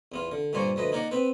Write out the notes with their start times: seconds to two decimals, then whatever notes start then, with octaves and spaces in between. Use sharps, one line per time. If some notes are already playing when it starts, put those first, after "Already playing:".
0.12 E2 B3 F4
0.32 D3
0.53 G2 A#2 A#3 C5 D5 C#6
0.76 D2 F3 B4 D#5
0.92 A#3 D#4 D5 D#5 F#5
1.11 B3 C4 B4